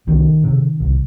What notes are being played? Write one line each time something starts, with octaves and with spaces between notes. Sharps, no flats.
C2 D#3
C3
C2